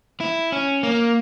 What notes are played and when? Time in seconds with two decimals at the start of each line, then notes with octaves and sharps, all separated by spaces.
0.20 E4
0.52 C#4
0.83 A#3